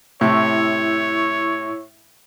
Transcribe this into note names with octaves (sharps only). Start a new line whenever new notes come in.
A2 C3 E4 C#5 C#6 E6